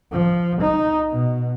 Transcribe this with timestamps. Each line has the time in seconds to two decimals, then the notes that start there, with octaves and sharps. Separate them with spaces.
0.12 F3
0.61 D#4
1.12 B2